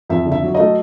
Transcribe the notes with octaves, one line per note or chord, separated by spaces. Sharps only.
F2 E5
D3
E5
F#3
A3 D#5